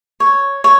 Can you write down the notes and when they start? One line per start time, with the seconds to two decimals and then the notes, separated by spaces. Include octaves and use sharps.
0.20 C#5
0.64 C#5